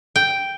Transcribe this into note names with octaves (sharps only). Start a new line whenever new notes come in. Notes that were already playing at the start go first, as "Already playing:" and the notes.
G5